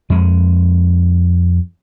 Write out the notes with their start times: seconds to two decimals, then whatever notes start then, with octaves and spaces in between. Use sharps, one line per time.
0.10 F2 G#3